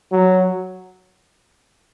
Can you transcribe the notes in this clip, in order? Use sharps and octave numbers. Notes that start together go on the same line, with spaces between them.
F#3